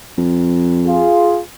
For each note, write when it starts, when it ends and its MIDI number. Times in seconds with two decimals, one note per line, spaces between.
0.18 1.05 41
0.86 1.39 65
0.86 1.39 68